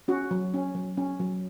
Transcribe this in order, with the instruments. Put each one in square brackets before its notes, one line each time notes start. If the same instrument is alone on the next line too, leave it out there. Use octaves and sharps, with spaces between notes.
[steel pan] C#4 F#4
F#3
C#4
F#3
C#4
F#3